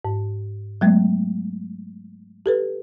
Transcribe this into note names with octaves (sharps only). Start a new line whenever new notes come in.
G#2
F#3 G#3 A3 B3
G4 A4 B4